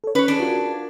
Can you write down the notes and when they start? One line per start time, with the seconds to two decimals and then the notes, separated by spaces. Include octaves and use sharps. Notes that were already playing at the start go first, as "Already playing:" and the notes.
0.04 A4 C#5
0.15 C#4 B4 C#5
0.28 D4 G#4
0.40 F4 F#4 A#4